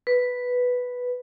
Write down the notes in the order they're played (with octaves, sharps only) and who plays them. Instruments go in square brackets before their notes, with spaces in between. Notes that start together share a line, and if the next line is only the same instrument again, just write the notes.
[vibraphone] B4